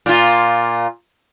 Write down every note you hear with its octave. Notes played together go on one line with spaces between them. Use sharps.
A#2 F4